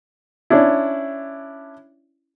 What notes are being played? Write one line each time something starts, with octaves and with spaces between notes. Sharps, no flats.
C#4 D4 E4